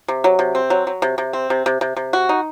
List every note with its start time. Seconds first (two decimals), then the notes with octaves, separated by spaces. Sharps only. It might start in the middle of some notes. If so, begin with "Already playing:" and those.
0.08 C3
0.24 F#3
0.39 C3
0.55 C4
0.70 F#3
0.87 F#3
1.02 C3
1.18 C3
1.33 C4
1.50 C3
1.66 C3
1.81 C3
1.96 C3
2.13 F#4
2.29 D#4